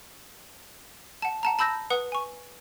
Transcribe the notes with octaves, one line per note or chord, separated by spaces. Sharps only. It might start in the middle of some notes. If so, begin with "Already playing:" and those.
F#5 A5
F#5 A5 A#5
A5 B5 E6 G6 A#6
B4 F#5 D#6
G#5 C#6